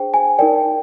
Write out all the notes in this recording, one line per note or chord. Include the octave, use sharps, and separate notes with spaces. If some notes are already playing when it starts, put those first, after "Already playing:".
Already playing: D4 G#4 C5 G5
G#5
D#4 A#4 D5 G5